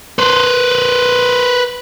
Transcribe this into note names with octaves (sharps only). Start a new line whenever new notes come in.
B4 C5